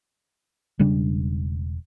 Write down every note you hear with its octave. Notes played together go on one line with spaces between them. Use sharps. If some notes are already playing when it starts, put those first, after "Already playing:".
E1 C#3 G3 D4